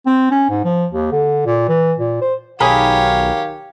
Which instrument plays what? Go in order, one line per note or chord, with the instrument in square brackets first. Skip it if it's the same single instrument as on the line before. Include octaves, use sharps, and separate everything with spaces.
[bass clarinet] C4
C#4
G#2
F3
D#2
D3
A#2
E3
A#2
C5
[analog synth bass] B1 [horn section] D#3 F5 [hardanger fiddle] G4 C#5 [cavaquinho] G#4 A#4 B5